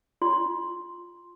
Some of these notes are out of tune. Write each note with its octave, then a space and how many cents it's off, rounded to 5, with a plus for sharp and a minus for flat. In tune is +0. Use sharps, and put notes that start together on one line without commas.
F4 +0 C6 +0